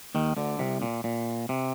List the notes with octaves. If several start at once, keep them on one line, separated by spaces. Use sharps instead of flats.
D#2 D#3
D2 D3
C2 C3
A#2
A#2
C3